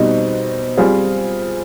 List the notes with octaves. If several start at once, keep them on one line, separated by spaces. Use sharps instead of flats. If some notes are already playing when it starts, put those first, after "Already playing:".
Already playing: B2 G3 C4 D#4
G3 C4 F4 G#4